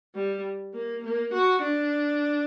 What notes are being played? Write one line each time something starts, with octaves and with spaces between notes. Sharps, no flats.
G3
A#3
A#3
F#4
D4